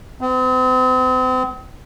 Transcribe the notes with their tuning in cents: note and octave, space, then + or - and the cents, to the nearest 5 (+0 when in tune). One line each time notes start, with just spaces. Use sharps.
C4 -40